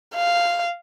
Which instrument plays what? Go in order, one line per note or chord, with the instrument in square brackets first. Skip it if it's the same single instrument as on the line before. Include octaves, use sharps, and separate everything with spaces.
[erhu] F5